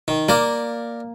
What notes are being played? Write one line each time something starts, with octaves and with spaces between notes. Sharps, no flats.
D#3
A#3 A#4 D5